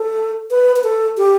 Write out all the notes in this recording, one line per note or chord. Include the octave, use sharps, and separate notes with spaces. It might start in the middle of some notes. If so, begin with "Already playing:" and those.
Already playing: A4
B4
B4
A4
G4